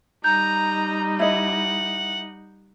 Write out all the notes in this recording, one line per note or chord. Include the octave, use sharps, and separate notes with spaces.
G3 D#4 A#5 G6
E4 D#5 F#5